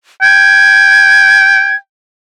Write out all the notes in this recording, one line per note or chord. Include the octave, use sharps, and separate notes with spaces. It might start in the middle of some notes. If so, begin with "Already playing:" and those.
G5 G#6